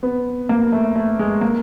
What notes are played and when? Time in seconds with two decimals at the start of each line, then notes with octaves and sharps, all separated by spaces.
0.03 B3
0.49 A#3
0.72 A3
0.96 A3
1.19 G#3
1.41 A#3